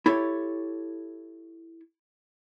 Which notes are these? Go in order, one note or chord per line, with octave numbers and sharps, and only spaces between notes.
E4 G4 A4 C#5